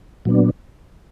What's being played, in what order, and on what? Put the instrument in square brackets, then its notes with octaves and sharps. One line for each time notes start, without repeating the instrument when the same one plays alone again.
[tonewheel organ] A#2 F#3 B3 D4